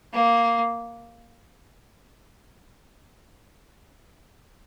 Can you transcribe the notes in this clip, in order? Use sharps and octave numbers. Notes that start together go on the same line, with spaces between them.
A#3